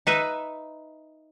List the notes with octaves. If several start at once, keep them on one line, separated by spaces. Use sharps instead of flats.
D#4 B4 E5